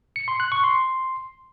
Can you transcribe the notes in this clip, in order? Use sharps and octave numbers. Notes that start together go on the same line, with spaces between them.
C#7
C6
F#6
C#6
C6